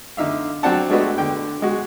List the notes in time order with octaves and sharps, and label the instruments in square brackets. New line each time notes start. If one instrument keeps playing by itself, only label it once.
[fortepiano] D3 D#4 E5 F5
F#3 C4 D4 F#5 A5
G#3 A3 D4 F#4 B4 D#5
D3 G5
G#3 F#4